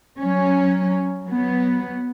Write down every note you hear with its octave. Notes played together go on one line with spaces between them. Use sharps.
F#3 C#4
F#3 B3